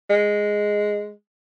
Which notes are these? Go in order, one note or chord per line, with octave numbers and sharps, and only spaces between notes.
G#3